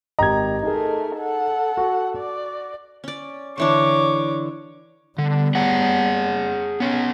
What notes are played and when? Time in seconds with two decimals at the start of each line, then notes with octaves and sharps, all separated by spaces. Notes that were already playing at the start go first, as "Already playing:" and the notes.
0.19 G#1 G4 D#5 A#5 G#6
0.63 A3 D#4 G#4 A#4
1.17 A4 F#5
1.77 F#4
2.16 D5
3.04 C#4 D5
3.58 D3 E3 D4 C#5 D6
5.18 D3 G3 B3
5.55 G#4 C#5 F#5
6.80 B3 C#4 C#5